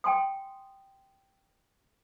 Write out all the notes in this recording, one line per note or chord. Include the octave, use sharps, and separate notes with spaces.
G5 G#5 C6 D#6